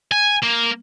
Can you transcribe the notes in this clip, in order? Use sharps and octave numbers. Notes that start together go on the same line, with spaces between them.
G#5
A#3